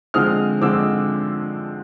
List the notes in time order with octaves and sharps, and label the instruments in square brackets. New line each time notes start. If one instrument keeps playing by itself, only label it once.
[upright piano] D3 F3 G#3 C4 D#6 F6
D3 F3 G#3 C4 D6 E6